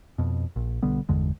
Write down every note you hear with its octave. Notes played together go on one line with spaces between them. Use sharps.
F2 B2
A#1
B1 D3 G3 B3
G1 E2 D3 G#3